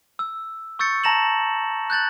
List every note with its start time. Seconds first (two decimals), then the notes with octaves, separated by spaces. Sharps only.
0.19 E6
0.79 C#6 E6 G6 A6 C#7
1.04 A5 A#5 A#6 E7 F#7
1.90 F#6 G6 A6 F#7